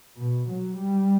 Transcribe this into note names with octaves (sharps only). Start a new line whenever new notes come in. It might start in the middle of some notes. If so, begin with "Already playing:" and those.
B2
F#3
G3